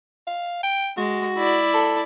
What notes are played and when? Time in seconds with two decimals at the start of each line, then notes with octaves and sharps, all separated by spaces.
0.27 F5
0.63 G5
0.97 G#3 F#4
1.37 E4 D5
1.74 A4